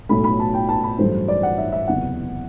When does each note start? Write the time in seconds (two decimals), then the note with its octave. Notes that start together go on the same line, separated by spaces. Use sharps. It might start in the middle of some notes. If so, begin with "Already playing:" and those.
0.09 B1 A2 F#3 A3 B5
0.24 B5
0.40 A5
0.54 G5
0.69 A5
0.83 B5
0.98 A1 G2 F#3 A3 C5
1.28 D5
1.43 F#5
1.58 E5
1.72 E5
1.88 F#1 E2 C3 F#5